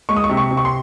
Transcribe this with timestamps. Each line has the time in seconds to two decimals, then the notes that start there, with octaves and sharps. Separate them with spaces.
0.09 G#3 C#6
0.17 D#6
0.24 C#6
0.30 C3
0.37 C#6
0.51 C3
0.57 C#6
0.65 C6